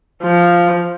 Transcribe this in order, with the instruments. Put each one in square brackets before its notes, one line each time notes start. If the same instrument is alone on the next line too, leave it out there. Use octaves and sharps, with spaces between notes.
[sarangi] F3